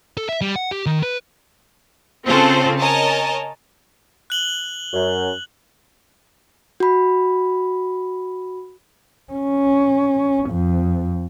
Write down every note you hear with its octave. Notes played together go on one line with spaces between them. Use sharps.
A4
E5
G3
F#5
G4
D#3
B4
C#3 C4 F4 A4 C5
A#4 C#5 D#5 G#5 A5
F#6 F#7 G7
F#2
F#4 B5
C#4
F2